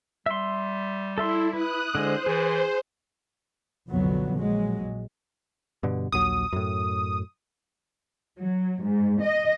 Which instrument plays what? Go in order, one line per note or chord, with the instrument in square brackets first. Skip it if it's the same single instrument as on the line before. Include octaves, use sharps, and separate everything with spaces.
[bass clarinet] G3 [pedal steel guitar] E5 C6
[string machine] E4 [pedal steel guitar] A4 E5 C6
[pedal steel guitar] B4 [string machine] D#6 F#6
[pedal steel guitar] D3 G#3 [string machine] C5
[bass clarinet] E3 [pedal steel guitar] G#4
[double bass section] C2 F2 A#2 D3 F#3 B3
A#1 A#2 F#3 G#3
[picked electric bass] G2 B2 D3
[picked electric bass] A#1 D#2 F#3 [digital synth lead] D#6
[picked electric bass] F#2 A2
[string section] F#3
G#2
D#5